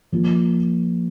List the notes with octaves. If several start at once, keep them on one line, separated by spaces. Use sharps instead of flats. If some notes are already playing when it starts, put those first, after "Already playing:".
F3 A#3 F4